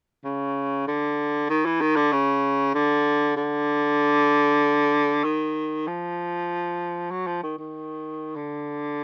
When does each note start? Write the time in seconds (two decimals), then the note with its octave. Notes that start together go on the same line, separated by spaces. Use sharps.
0.24 C#3
0.88 D3
1.50 D#3
1.66 E3
1.81 D#3
1.96 D3
2.12 C#3
2.75 D3
3.36 D3
5.24 D#3
5.87 F3
7.11 F#3
7.27 F3
7.43 D#3
7.58 D#3
8.36 D3